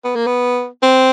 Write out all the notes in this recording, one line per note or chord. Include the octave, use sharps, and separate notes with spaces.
B3
A#3
B3
C4